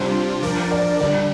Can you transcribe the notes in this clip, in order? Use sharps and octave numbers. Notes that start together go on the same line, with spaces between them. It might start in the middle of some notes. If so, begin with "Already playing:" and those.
Already playing: C3 G3 D4 F4 C5
F3 D4 A#4 D5
D5
D3 G3 D4 D5